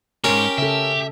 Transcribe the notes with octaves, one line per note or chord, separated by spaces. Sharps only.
C#2 G#2 C#4 G4 A#4
C#3 A4 E5